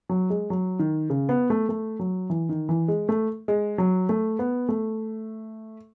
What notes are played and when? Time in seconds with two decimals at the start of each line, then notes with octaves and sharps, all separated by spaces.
0.09 F#3
0.30 G#3
0.50 F#3
0.79 D#3
1.10 C#3
1.29 B3
1.50 A3
1.69 A3
1.99 F#3
2.30 E3
2.49 D#3
2.69 E3
2.88 G#3
3.09 A3
3.48 G#3
3.78 F#3
4.09 A3
4.39 B3
4.69 A3